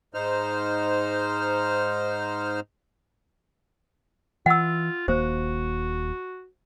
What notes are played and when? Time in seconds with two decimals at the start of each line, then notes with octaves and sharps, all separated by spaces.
0.14 G#2 D#4 C5 F6
4.46 E3 F4 F#5 E6
5.08 D#1 D#2 A#3 F#4 C5